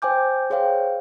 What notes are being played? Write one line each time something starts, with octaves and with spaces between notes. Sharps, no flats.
C5 G5 G#5 D6 G6
G#4 C5 C#5 F5 G5